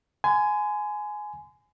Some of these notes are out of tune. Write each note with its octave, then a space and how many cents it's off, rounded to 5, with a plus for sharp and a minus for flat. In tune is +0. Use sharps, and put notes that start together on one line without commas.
G#5 +15 C6 -40